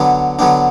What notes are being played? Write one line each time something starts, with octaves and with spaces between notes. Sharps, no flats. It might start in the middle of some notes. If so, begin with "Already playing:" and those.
Already playing: D3 F#3 B3 D4
D3 F#3 B3 D4